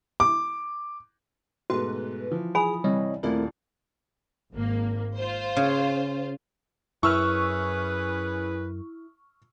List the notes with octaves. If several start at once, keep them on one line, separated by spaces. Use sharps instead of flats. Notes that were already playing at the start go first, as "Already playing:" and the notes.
D6
G#2 B2 A3 F#4 B4
E3 F3
G#4 G#5 B5 D#6
C2 C3 E3 G3 C#5 D#5
D#1 A3 C4 E4 F4 A#4 D5
G#1 A#3
F4 C5
C#3
F#2 C#4 E4 G#4 B4 C#6 E6 F6